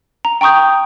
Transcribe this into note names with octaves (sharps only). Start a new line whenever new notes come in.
A#5
G5 A#5 C#6 D#6 G6